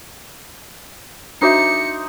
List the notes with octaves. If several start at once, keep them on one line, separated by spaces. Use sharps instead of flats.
D4 D#4 F#4 C5 E5 D6 C#7